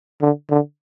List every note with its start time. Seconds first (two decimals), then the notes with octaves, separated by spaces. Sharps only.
0.22 D3
0.50 D3